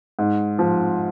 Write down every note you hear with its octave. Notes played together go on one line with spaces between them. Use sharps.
G#2
F3